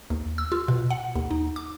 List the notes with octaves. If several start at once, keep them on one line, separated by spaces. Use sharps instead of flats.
D#2
E6
F4
B2
F#5
D#2
D#4
D6